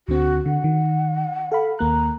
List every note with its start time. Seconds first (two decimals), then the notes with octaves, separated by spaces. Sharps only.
0.08 D2 D3 C4 F#4
0.46 D3 F#5
0.64 D#3
1.52 A4 F5 B5
1.79 D#2 A#3 A#5 F#6